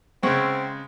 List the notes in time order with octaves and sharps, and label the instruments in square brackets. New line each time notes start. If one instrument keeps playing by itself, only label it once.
[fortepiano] C#3 G#3 [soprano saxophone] C4 [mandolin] E5 F#5 C#6